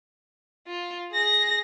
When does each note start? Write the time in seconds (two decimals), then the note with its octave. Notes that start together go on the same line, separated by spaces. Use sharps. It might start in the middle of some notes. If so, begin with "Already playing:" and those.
0.67 F4
1.12 G#4 A#6